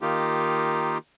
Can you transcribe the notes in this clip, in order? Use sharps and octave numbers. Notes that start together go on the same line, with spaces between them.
D#3 A#3 D#4 F4 G4